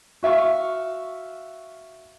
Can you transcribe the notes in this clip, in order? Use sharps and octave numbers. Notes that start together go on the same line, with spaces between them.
F#4 E5 F5 C#6